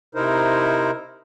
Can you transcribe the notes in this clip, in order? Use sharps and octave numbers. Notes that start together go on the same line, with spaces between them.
C3 D#4 E4 A#4 C5